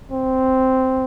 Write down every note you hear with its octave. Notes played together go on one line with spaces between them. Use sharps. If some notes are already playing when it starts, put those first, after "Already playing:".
C4